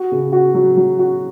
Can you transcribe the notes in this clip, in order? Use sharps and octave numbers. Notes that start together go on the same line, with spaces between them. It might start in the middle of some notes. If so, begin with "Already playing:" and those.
Already playing: F#4
C#3
F#4
F#3
F#3
F#4